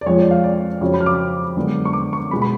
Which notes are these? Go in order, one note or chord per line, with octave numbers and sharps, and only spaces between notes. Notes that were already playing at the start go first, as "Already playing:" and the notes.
D5
F2 F3 G#3 C#5
D5
F5
D5
F2 C#3 F#3 C#5
B5
F6
D6
F#2 D3 G#3 B3
C#6
D6
C#6
B2 G#3 B3 B5
B5